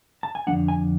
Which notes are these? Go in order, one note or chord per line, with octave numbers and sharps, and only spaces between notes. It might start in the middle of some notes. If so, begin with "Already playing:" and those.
A5
G#5
F2 D3 G#3 D4 F#5
G#5